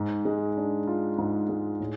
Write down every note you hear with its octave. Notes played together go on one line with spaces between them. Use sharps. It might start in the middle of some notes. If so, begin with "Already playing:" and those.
Already playing: G#2
G#3
D4
F4
G#2
G#3
A2